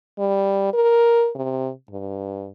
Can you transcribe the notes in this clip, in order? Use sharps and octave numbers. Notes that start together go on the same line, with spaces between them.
G3
A#4
C3
G2